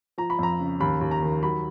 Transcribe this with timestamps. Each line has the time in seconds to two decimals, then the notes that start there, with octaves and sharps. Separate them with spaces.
0.18 F3 A#5
0.30 B5
0.39 F2 A#5
0.60 C#3
0.80 D#2 B5
1.01 D#2
1.11 A#5
1.23 D#3
1.43 F#3 B5